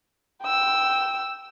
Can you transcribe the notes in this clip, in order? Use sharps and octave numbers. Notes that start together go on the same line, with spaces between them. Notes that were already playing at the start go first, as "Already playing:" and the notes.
G5 E6